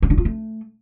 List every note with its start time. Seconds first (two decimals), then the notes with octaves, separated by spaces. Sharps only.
0.02 C4
0.10 D4
0.18 F4
0.25 A3